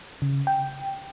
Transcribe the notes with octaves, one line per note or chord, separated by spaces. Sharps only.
C#3
G5